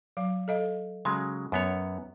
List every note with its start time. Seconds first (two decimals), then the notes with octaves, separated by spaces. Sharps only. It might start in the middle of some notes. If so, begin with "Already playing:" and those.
0.17 F#3 F5
0.48 A4 D#5 F5
1.05 C#3 F#3 G#3 C6
1.52 F#2 B3 C#5